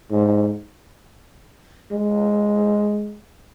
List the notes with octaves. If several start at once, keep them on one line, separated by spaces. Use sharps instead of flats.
G#2
G#3